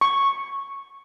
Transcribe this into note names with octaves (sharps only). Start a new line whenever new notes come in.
C#6